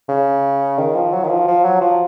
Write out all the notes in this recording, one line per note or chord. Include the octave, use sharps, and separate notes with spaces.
C#3
D#3
F3
F#3
D#3
F3
F3
F#3
F3